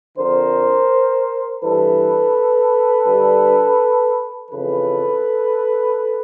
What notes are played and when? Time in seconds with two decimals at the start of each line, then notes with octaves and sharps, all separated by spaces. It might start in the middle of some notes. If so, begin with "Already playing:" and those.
0.18 F2 D3 A#4 C5
1.62 G2 E3 A4 B4
3.06 G2 D3
4.51 F2 C#3 E3 A4 B4